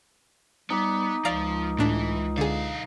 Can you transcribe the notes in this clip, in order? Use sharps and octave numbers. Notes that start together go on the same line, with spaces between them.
G3 B3 D#4 D6
C#2 F3 D5 F5 A#5
A2 E3 D4
B1 D3 G#4 F5